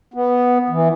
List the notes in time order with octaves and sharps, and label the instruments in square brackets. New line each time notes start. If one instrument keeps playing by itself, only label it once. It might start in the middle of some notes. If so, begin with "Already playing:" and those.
[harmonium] B3
E3